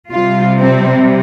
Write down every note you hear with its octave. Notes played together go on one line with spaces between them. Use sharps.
C3 G3 F4
C4